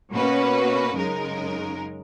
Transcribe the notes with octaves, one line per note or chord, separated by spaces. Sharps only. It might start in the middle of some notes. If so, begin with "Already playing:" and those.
B2 A#3 C#4 F#4 B4
F#2 C#3 G#3 D#4 A#4